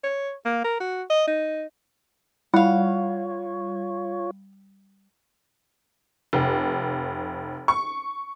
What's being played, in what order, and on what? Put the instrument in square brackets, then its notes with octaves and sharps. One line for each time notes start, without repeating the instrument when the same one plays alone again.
[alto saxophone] C#5
A#3
A#4
F#4
D#5
D#4
[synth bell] G3 [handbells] E4 [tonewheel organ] F4 C#5 [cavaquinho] F5 F#5
[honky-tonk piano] F1
C#6